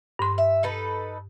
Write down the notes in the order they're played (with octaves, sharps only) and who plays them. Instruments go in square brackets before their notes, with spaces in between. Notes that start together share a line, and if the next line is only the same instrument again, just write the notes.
[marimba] G2 C6
[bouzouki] E5
D#4 A4 B4